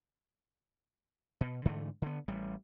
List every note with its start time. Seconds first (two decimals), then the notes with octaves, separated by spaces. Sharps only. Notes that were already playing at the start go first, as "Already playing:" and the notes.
1.41 B2
1.65 G#2 D3 E3 A3
2.02 D3 B3
2.28 A1 G3